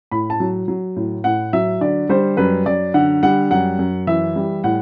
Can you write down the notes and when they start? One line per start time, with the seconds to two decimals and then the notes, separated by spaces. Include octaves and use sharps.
0.11 A2 B5
0.30 A5
0.40 F#3
0.68 F#3
0.96 A2
1.24 A2 F#5
1.53 F#3 E5
1.81 D3 D5
2.09 G3 C5
2.37 F#2 B4
2.66 F#2 D5
2.94 D3 F#5
3.23 G3 F#5
3.51 F#2 F#5
3.79 F#2
4.07 E3 E5
4.36 G3
4.64 A2 F#5